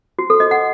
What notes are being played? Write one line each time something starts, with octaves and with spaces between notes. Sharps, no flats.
F#4
A4
D#5
F#5